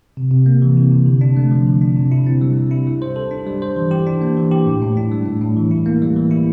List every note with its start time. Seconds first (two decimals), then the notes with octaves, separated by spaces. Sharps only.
0.17 C3
0.31 C3
0.46 A#3
0.62 E3
0.77 C3
0.92 C3
1.06 D3
1.21 D4
1.37 A3
1.51 F3
1.67 D3
1.81 D4
1.96 C3
2.12 E4
2.27 C4
2.41 G3
2.57 C3
2.71 E4
2.87 G3
3.02 C5
3.16 A4
3.31 D4
3.47 G3
3.62 C5
3.76 E3
3.91 G4
4.07 D4
4.21 A#3
4.37 E3
4.51 G4
4.66 A2
4.82 A2
4.97 D4
5.11 G3
5.26 A2
5.42 A2
5.56 E3
5.71 E4
5.86 A#3
6.02 G3
6.16 E3
6.31 E4